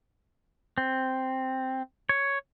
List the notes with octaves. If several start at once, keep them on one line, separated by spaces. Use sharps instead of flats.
C4
C#5